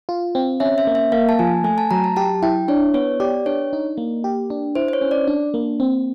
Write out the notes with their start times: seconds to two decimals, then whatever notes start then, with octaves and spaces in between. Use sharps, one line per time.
0.09 F4
0.35 C4
0.60 C#4 E5
0.78 E5
0.87 A#3
0.95 E5
1.12 A#3 F5
1.29 A5
1.39 F3 G#5
1.64 A3 G#5
1.78 A5
1.91 F#3 A#5
2.04 A5
2.16 G4 A5
2.42 E4 G5
2.68 D4 C#5
2.94 B3 C#5
3.20 G4 D5
3.46 D4 C#5
3.73 D#4
3.98 A#3
4.24 G4
4.50 D4
4.75 E4 C5
4.88 C5
4.93 C#5
5.01 C#4
5.11 D5
5.27 D4
5.54 A#3
5.80 C4